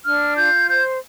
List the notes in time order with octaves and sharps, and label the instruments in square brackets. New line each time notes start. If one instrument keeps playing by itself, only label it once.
[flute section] D4 F6
F4 G6
C5 G6